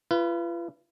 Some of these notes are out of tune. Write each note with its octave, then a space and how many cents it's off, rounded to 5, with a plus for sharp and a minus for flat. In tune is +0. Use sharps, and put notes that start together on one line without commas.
F4 -40 B4 +0